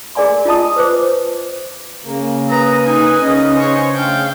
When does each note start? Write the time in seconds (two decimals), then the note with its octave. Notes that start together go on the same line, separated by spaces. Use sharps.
0.15 G#4 A#4 D5 G#5 C6
0.45 F4 D#5 A5 D#6
0.76 B4 C5 D6
2.04 C#3 A#3
2.50 A#4 B4 A#5 D#6
2.86 D#4 G#5
3.21 C#3 C#4 D#4 B4 D#5
3.55 G#4 C5 C#5
3.94 A3 D4 F5 G5